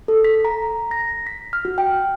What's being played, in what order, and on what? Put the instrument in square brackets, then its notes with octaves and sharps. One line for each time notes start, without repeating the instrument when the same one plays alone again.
[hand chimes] A4
B6
A#5
A#6
B6
F6
F#4
G5